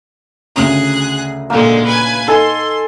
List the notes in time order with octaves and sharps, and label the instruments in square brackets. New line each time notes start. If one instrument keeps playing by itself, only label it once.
[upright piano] D2 C#3 A#5 [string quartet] G#4 F#6
[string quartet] A#2 D3 G#3 [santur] A#3
[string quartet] B4 G#5
[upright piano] D#4 [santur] A4 G#5 [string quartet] C6